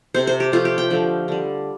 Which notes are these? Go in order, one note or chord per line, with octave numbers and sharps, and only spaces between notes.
C3 A3 C5
C5
G4
C3 F3 A3 F4
G4
G5
D3 F3 A3
D3 G3